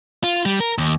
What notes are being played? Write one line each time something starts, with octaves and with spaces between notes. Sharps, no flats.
F4
G3
A#4
D#2